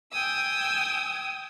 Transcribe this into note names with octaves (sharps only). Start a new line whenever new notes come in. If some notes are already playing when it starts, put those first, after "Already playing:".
G5 G#5 D#6 E6